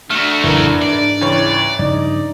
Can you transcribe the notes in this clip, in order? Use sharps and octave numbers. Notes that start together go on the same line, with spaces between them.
A3 D4 F#4 F6
F#1 F2 A2 E3 A#4
G#2 D5
C#2 E3 C#5
G2 C#3 F3 D#4 D5